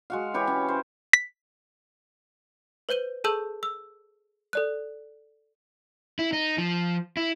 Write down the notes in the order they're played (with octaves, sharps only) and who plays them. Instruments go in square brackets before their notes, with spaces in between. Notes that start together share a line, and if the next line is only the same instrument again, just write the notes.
[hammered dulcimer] G#3 F#4 F5
E3 G4 B4 C#5
C#4
C5
[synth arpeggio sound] B6
[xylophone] B4 C5 G6 D#7 G7
G#4 A4 A5 E6 G6 F#7
E6
A4 D5 F#6
[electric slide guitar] E4
D#4
F3
E4